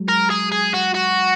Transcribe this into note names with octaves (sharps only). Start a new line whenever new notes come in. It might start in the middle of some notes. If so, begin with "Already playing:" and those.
Already playing: F#3 G#3
A#4
G#4
G#4
F#4
F#4